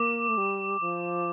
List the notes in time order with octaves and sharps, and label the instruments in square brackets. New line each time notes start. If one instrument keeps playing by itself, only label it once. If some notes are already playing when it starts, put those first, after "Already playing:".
Already playing: [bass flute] A#3 [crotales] D6
[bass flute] A3
G3
F3